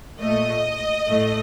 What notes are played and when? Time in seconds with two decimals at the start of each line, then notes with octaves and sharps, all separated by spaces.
0.20 A#2 A3 D#5
1.08 A2 A3